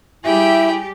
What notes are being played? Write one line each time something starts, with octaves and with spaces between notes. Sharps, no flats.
G3 E4 G4 G#4 E5 G5